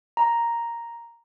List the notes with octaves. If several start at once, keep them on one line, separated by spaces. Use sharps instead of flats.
A#5